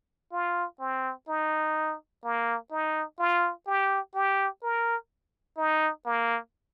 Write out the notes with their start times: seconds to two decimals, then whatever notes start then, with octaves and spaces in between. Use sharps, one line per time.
0.32 F4
0.80 C4
1.28 D#4
2.24 A#3
2.71 D#4
3.19 F4
3.67 G4
4.15 G4
4.63 A#4
5.57 D#4
6.05 A#3